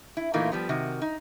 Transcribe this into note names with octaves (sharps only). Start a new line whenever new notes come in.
E4
A#2 E3 A3 A#3 D#4 F4
F3 G3 B3
C3 D#3 F#4
D#4